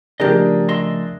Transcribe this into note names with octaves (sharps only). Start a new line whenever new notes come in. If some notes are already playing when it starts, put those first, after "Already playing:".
C#3 F3 A3 D4 G4 G#4 A#4 D#5
D#5 E5 C6